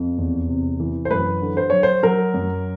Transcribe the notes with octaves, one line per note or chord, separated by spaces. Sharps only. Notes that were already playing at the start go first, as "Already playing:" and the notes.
Already playing: F2
E2
C3
E3
C5
F#2 B4
D3
C5
F#3 C#5
C5
F#3 A#4
F#2